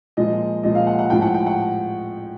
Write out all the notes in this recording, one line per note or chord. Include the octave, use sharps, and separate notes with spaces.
A#2 F3 G#3 D#5
A#2 F3 G#3 D#5
F5
F#5
F#5
A2 F3 G#3 G5
F#5
G5
F#5